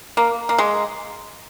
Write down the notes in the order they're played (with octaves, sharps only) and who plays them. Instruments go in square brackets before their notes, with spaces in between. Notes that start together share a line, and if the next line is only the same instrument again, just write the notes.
[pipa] A#3
A#3
G#3